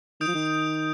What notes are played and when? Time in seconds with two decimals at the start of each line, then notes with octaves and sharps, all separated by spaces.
0.20 D#3 D#6 G6 D7 F7
0.27 F3
0.35 D#3